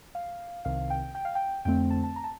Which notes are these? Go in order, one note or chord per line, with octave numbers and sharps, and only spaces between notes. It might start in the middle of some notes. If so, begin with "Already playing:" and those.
F5
C2 C3 D#3 F5
G5
G5
F5
G5
F2 D3 A3 C4 G5
A5
A5
A#5
A5